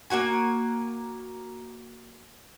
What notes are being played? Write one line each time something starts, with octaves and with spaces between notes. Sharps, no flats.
A#3 E4 F#4 G#5